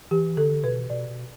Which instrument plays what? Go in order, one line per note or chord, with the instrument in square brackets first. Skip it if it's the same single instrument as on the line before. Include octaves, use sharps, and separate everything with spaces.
[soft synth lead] E3 [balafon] G4
[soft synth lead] D3 [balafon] A4
[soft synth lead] B2 [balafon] B4
[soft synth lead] B2 [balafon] D5
[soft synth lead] B2